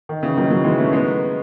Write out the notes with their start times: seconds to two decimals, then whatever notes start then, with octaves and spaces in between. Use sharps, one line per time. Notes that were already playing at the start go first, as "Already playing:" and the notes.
0.09 D#3
0.23 C#3 E3
0.37 D#3 F#3
0.50 D#3 F#3
0.64 E3 G#3
0.78 A3 C#4
0.93 G#3 B3